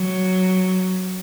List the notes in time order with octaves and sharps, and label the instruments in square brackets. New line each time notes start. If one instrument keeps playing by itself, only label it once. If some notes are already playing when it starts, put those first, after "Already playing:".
Already playing: [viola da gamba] F#3